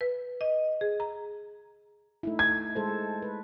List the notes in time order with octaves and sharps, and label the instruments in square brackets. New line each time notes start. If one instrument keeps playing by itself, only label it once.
[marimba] B4
D#5
G#4
A#5
[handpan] A3 D#4 E4
[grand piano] G#6
[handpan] G#3 A4 C5
B4